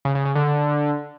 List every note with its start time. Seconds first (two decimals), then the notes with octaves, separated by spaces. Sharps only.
0.05 C#3
0.15 C#3
0.25 C#3
0.35 D3